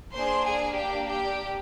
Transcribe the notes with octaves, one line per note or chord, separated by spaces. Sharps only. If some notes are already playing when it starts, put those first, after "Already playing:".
A#3 D4 G#4 C5 C6
G#4 G#5
G4 G5
G4 G5